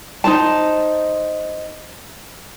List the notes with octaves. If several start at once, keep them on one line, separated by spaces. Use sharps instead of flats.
D#4 C5 A5